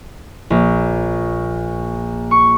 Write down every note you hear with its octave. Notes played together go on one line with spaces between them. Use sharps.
A#1
C#6